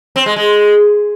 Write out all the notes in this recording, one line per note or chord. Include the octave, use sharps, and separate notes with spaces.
C4
G#3
G#3